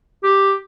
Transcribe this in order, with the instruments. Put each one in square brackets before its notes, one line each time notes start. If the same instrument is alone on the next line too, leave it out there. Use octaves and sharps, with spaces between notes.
[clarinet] G4